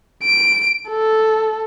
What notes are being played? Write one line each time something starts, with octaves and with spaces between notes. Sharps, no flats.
D7
A4